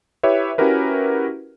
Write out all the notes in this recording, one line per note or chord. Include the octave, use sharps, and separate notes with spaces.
E4 G4 B4 C#5 E5
C#4 E4 F#4 G4 A#4 B4